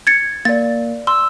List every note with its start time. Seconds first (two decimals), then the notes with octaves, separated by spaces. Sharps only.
0.07 G#6 A6 C#7
0.45 A#3 D5 A6
1.07 C6 E6